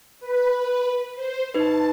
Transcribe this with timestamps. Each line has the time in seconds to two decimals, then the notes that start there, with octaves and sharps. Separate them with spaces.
0.20 B4
1.15 C5
1.54 D#4 B4 A5